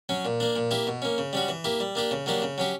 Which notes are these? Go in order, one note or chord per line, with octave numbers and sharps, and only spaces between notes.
F#3 C#4
A#2
A#3 D4
A#2
A#3 E4 G4
B2
A#3 C#4
C#3
G3 C#4 F#4
E3
A#3 E4 G4
G3
A#3 D4 G4
C#3
F#3 A#3 D4 G4
C#3
F#3 C#4 G4